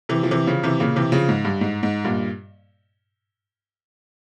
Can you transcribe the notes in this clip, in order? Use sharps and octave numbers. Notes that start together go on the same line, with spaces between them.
C3 E3
F3
C3 E3
C#3 F3
C3 E3
A#2 C#3
C3 E3
C#3 F3
G#2
G2
G#2
G#2
G2 A#2